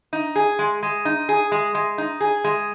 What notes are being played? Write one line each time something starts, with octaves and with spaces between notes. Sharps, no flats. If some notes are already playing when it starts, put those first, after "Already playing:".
D#4
G#4
G#3
G#3
D#4
G#4
G#3
G#3
D#4
G#4
G#3